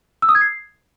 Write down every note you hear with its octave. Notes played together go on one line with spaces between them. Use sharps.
E6
D#6
G#6
C7